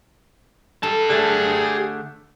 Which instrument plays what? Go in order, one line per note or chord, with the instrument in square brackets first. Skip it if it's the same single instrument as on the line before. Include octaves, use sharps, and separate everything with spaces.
[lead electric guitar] G4 A5 [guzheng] A4
[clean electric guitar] D3 A3 [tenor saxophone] G#4